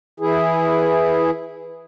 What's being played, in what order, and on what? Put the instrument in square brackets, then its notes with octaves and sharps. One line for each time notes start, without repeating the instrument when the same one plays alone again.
[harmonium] E3 E4 G#4